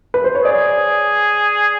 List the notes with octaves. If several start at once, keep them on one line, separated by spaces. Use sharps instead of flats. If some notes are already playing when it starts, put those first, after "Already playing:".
B4
C5
C#5
G#4 D5